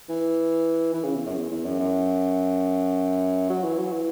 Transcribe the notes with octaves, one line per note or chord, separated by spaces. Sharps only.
E3
E3
C#3
E2
F#2
E2
E2
F#2
F#2
F#3
E3
F#3
E3